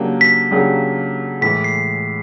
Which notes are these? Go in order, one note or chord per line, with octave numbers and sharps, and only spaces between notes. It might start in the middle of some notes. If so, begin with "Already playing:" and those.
Already playing: C#3 F#3 A#3 D4 G4
B6
C#3 F#3 A#3 D4 G4
A2 E3 G#3 B6
C7